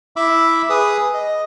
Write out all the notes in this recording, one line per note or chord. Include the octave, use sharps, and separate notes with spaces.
E4 E5 B5 D6 E6
G#4 B4 D#6
D#5